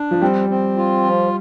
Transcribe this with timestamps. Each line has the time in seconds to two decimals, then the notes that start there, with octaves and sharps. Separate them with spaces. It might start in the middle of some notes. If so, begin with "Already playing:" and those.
Already playing: D4
0.11 F3
0.21 G3 C4
0.49 C4
0.77 F4
1.05 F3